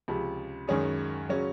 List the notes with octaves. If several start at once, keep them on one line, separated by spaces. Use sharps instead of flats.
C#2 C3 F3
F#2 D#3 G#3 C#4 G#4
C#3 F#3 C#4